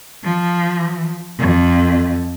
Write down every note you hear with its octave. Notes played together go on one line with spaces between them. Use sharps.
F3
F2